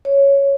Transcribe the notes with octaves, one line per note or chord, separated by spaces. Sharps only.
C#5